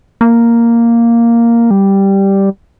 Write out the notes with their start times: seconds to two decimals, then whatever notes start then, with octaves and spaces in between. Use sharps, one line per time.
0.21 A#3
1.71 G3